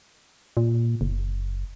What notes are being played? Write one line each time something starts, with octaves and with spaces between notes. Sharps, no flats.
A#2
F#1